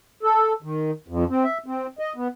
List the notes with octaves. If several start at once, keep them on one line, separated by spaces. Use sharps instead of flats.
A4
D#3
F2
C4
E5
C4
D#5
B3